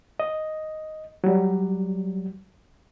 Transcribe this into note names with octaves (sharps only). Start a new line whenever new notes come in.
D#5
F#3 G3